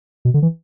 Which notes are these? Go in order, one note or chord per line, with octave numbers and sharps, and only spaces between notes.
B2
D3
E3